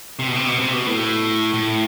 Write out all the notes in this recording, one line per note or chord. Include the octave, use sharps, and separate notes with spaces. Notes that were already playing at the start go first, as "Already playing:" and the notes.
C3
B2
C3
B2
C3
B2
A2
A2